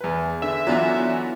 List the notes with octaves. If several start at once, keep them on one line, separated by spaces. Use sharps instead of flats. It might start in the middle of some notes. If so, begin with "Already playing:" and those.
E2 B4
D3 E5
E3 F#3 B3 D4 F4 F#4